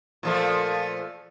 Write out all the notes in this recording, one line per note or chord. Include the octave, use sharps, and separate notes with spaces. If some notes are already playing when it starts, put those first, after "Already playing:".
A#2 F3 A3